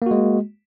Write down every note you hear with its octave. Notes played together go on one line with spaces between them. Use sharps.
G#3 A#3 F#4